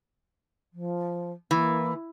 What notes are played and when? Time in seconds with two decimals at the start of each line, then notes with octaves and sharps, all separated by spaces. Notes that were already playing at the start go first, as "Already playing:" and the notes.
0.73 F3
1.51 E3 A#3